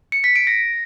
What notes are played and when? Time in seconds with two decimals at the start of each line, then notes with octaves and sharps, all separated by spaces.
0.12 C#7
0.24 B6
0.36 D7
0.47 A#6